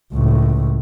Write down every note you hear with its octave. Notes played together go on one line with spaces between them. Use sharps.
C#2 A2